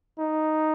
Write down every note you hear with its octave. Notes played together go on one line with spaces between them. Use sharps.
D#4